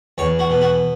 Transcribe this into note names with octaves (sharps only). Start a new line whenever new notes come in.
E2 C#5
F#4
B2
F#4